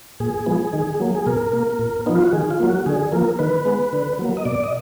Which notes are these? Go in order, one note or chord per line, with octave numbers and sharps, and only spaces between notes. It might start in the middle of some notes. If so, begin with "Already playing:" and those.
A#2 G#4
F3 G#3 B3
D#3
F#3 A#3
G#4
B2 A#4
A#3
A#2
F3 B3 D#4
F4
F#4
D#3 G#4
F4
F#3 A#3
F#4
D3 G#4
F3 A#3 A#4
D#3 B4
G#3 B3
D3
F#3 A#3
D#5
B2 D5
D#5